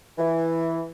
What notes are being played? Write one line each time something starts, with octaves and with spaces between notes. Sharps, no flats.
E3